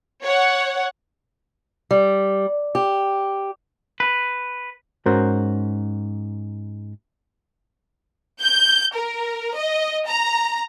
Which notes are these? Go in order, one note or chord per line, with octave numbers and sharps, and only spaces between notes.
C#5 F#5
G3
G4
B4
G#2 C#4 F#4 A#4 C5
G6
A#4
D#5
A#5